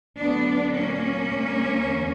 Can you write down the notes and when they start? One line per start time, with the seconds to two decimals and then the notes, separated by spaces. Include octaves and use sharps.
0.18 D2 D3 F#3 B3 D4
0.73 A#2 F#3 A#3 C#4
1.27 D2 C#3 G3
1.82 E2 D3